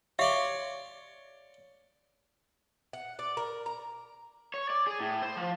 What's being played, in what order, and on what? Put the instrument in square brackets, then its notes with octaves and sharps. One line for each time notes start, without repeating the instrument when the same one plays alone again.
[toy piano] G4 E5 F5 [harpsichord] C#5 D5 C6
[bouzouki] F#5
D5
A#4
A#5
[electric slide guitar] C#5
D5
G#4
A2
C5
F3